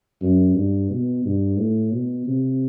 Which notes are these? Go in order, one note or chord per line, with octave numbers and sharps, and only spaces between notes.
F#2
G2
B2
G2
A2
B2
C3